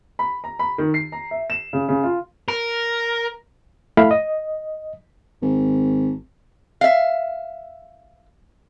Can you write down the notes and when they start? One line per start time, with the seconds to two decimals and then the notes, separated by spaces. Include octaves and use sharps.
0.19 B5
0.44 A#5
0.59 B5
0.78 D#3
0.94 C7
1.12 A#5
1.31 E5
1.50 E7
1.73 C#3
1.89 C#3
2.03 F4
2.48 A#4
3.97 A3 E4 E5 F5 B5
4.11 D#5
5.42 G#1
6.81 E5 F5